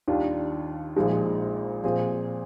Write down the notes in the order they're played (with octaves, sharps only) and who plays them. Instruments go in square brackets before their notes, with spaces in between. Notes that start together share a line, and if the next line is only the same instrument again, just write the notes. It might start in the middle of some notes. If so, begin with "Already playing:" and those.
[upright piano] D#2 D#3 G3 D4 F4
A#1 A#2 F3 G#3 D#4
A#2 F3 C4 F4 G#4